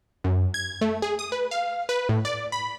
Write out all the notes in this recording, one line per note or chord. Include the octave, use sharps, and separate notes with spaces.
F#2
G#6
A3
G#4
D#6
B4
F5
B4
A2
D5
B5